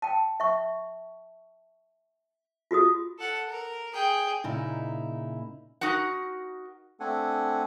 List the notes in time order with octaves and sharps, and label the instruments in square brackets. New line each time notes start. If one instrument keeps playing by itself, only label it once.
[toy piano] G5 A5
E5 C#6
F4 F#4 G#4 D#6
[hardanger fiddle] A4 F#5
A#4
G#4 G5
[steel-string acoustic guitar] A#2 C#3 D#4 E4
[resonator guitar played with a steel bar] D#4 F#4 A#4 F#5
[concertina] A3 C4 D4 A4 F#5 G#5